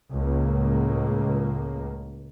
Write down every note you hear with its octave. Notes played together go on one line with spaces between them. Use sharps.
C#2 A2 A#3